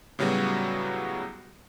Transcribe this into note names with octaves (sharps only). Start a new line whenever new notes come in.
A2 C#3 F#3 G3 B3 F#4